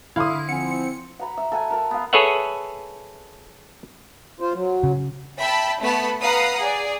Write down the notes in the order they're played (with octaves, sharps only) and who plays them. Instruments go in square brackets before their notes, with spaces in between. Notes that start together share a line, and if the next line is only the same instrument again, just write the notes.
[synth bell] D3 E4 [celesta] E5 F6 [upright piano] F5 C6 D#6
[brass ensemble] F3 C4 [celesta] F#5 G#5 [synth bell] C#7
[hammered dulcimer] F#5 A#5 B5
E5
A4 F#5 G#5
A#4 A5
B3 F5
[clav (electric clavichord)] G#4 A4 B4 C#5 E5 F#5
[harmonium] F4 C5
F#3
[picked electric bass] C#3
[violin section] E5 G5 A5 B5
A3 B3 A5 B5
B4 F5 F#5 A#5 D#6
G#4 D5